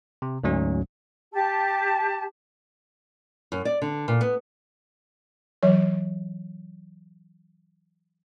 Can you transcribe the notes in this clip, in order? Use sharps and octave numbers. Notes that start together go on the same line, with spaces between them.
C3
D2 G#2 F#3 C#4
G4 A5
F#2
D5
D3
A#2
B3
E3 F#3 C#5